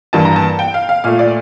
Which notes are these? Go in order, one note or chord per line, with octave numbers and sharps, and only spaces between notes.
G2 E3 A#3 A5
A#5
A5
G5
F5
F5
A#2 A3 F5
D5